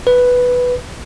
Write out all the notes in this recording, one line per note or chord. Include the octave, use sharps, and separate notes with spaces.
B4